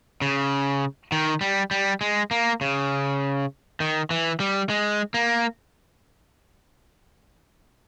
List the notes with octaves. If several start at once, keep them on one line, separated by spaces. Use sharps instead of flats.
C#3
D#3
G3
G3
G#3
A#3
C#3
D#3
E3
G3
G#3
A#3